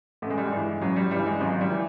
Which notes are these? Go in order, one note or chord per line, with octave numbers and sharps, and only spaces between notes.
A1 A3
G#3
G3
G#3
G2 E3
A1 F#3
G3
G2 E3 G3
G#3
G#1 F#3
G3
E3